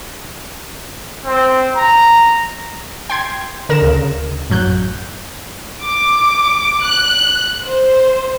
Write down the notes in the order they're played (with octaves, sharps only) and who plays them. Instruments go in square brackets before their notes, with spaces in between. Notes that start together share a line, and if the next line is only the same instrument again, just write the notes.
[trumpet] C4
A#5
[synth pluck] G5 C6 G#6
D3 A#4 A#5 E7
D2 C#3
A1 F#2 F#3 F#6 G6
[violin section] D6
F#6
C5